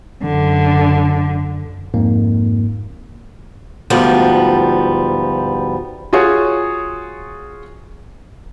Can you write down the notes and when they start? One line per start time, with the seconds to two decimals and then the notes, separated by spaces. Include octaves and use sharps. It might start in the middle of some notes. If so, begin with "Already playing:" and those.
0.23 F#2 D3
1.94 F2 G#2 A#3
3.90 D2 G#2 F3 G3 B3
6.13 F4 F#4 G#4 C#5